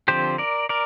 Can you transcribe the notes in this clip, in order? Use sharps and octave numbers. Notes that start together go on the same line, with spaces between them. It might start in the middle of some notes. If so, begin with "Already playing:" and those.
D3 F3 C4 G4 C5
A#4 D5
A#4 D5